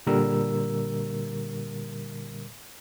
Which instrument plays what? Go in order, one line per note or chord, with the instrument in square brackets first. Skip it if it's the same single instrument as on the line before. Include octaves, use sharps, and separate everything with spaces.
[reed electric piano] A#2 D3 G3 A#4 E6